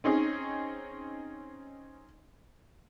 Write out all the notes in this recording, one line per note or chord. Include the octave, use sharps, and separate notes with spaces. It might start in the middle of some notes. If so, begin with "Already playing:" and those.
C4 C#4 D#4 G#4